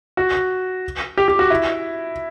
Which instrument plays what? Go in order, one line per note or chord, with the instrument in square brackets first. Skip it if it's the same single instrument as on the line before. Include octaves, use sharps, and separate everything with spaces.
[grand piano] F#4
G4
G4
F#4
E4